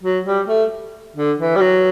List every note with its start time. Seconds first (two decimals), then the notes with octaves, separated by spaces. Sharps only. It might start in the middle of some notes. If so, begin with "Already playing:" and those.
0.03 F#3
0.26 G3
0.48 A3
1.16 D3
1.39 E3
1.56 G3
1.61 F#3